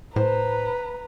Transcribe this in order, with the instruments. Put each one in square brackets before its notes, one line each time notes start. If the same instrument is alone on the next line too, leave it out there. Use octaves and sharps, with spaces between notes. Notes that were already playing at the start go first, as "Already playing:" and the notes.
[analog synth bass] A2 [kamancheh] B4 A#5 [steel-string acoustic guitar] C5 A5